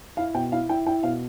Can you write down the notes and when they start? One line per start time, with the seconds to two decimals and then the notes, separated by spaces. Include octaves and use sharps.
0.17 E4 F5
0.34 B2 G5
0.52 E4 F5
0.69 E4 G5
0.87 E4 G5
1.03 B2 F5